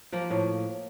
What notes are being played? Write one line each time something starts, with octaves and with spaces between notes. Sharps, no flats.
F3 A#3
A2